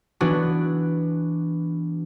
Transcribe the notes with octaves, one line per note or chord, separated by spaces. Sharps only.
E3 B3 D4 F#4